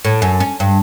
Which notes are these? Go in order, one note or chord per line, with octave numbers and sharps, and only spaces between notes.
A2
F#2
C#4
G2